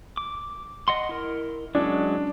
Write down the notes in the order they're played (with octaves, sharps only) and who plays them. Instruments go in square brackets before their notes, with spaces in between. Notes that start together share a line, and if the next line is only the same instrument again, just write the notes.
[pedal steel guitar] D6
D#5 F#5 C6
E4 A#4
[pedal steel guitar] F#3 G#3 C#4 [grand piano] D4